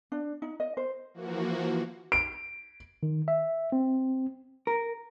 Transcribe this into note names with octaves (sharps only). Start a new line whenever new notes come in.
D4
D#4
D#5
C5
E3 F3 A#3 F#4
D7
D#3
E5
C4
A#4